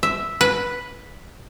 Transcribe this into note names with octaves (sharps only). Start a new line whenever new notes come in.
E5
B4